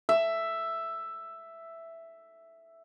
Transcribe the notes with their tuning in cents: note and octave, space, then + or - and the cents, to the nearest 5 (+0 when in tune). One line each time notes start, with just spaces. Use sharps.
E5 +5